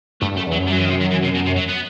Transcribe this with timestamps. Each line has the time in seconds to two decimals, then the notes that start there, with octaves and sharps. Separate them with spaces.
0.21 G2 A3
0.35 F#2 A3
0.47 E2
0.52 F#3
0.59 F#2
0.67 G3
0.72 F#3
0.78 E3
0.85 D#3
0.90 C3
1.01 D#3
1.11 E3
1.23 C3
1.35 B2
1.46 C3
1.56 F#3
1.68 B3